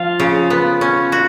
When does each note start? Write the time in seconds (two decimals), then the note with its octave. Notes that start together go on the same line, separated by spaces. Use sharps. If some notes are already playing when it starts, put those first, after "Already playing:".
Already playing: F3 F4 F5
0.20 C#3
0.50 B3
0.81 C#4
1.12 F#4